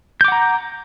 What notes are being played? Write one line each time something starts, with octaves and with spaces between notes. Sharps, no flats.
F#5 A#5 D6 G6